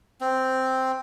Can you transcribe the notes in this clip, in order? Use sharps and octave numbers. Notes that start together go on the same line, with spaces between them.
C4